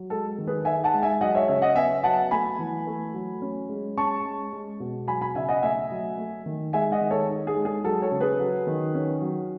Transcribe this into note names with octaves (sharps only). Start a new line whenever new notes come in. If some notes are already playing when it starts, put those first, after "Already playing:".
Already playing: F#3
G#3 A4
D#3
G#4 B4
D#4 E5 G#5
F#5 A5
G#3
E5 G#5
F#3 D#5 F#5
C#5 E5
C#3 C#5 E5
D#5 F#5
B3 E5 G#5
F#3 F#5 A5
A3 G#5 B5
E3
A3
F#3
C#4
G#3
C#4 A5 C#6
G#3
G#3
B2
F#3 G#5 B5
G#5 B5
C#3 E5 G#5
D#5 F#5
A3 E5 G#5
F#3
A3
D#3
G#3 E5 G#5
D#5 F#5
D#3
A4 C#5
D#4
G#4
G#3
G#4
F#3 A4
A4 C#5
C#3
G#4 B4
F#3
D#3
C#4
F#3